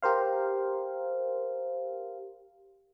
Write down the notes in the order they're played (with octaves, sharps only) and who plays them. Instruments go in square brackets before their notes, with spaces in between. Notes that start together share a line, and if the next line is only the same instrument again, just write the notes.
[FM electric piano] G4 A#4 C5 F5